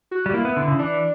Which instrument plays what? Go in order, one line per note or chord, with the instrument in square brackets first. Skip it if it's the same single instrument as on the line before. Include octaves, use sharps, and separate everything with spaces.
[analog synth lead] F#4
[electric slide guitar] G3
[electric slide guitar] A#3 [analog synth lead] E4
[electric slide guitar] B3
D3
C#3
[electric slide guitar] E3 [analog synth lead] D4